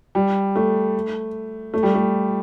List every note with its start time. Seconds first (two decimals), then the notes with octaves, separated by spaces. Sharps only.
0.15 G3
0.56 A3
1.74 A3
1.83 G3
1.94 A3